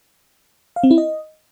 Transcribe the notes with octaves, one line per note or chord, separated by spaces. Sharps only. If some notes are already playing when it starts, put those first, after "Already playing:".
F5
C4
E4
D#5